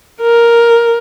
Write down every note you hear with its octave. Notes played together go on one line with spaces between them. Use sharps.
A#4